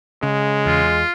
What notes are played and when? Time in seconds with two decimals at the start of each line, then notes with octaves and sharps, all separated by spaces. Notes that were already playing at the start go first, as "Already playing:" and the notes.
0.23 C#3 G#3
0.66 E2 F4